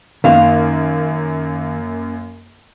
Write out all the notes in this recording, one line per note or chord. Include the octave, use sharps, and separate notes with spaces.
F#2 D#3 A#3 F#4 F5